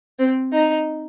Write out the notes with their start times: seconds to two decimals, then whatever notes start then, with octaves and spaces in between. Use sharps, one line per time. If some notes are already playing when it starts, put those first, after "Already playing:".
0.19 C4
0.53 D#4